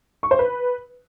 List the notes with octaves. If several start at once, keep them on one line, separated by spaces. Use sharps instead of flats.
C#6
C5
B4